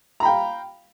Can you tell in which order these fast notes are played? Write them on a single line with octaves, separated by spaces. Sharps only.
A#5 B5 G5 F5